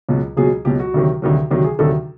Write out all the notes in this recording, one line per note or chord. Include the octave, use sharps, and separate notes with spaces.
C#2 B2 F#3
C#2 B2 F#3 G#4
C#2 B2 F#3 G4
F#4
D2 C3 D#3 F#3
D2 C3 D#3 F#3
D2 C3 D#3 F#3
G#4
D2 C3 D#3 F#3 A4